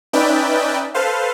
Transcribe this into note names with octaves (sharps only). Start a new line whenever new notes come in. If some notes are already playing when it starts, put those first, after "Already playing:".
C#4 D#4 B4 D5 E5 G5
A4 B4 C5 F5